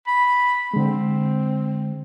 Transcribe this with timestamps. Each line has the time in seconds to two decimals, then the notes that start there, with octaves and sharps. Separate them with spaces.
0.07 B5
0.74 D3 G#3 C4